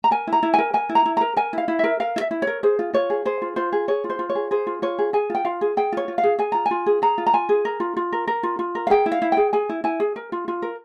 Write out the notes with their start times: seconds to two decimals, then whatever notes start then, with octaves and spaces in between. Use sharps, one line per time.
0.04 A#5
0.11 A#4 G#5
0.27 E4
0.33 A#5
0.43 E4
0.54 A#4 G#5
0.74 A#4 G#5
0.89 E4
0.95 A#5
1.06 E4
1.17 A#4 A#5
1.37 A#4 G#5
1.53 E4 F5
1.68 E4
1.79 A#4 E5
2.00 A#4 F5
2.16 E4
2.21 E5
2.31 E4
2.42 C#5
2.47 A#4
2.63 G#4 C5
2.79 F4
2.93 F4 C#5
3.10 G#4
3.25 G#4 C5
3.42 F4
3.56 F4 C5
3.73 G#4
3.88 G#4 C#5
4.04 F4
4.10 C5
4.19 F4
4.30 C#5
4.35 G#4
4.51 G#4 C5
4.67 F4
4.82 F4 C#5
4.99 G#4
5.13 G#4 G#5
5.30 F4 G5
5.45 F4 F5
5.61 G#4
5.77 G#4 G5
5.92 F4 C#5
6.08 F4
6.18 F5
6.24 G#4
6.39 G#4 G#5
6.52 F4 A#5
6.66 G#5
6.71 F4
6.86 G#4
7.02 G#4 A#5
7.18 F4
7.27 A#5
7.33 F4 G#5
7.49 G#4
7.65 A#4
7.80 F4
7.97 F4
8.13 A#4
8.27 A#4
8.43 F4
8.59 F4
8.75 A#4
8.87 F5
8.90 G#4 G5
9.06 E4
9.12 F5
9.22 E4
9.32 G#4 G5
9.53 G#4 G#5
9.69 E4
9.84 E4 G#5
10.00 G#4
10.16 A#4
10.32 F4
10.48 F4
10.62 A#4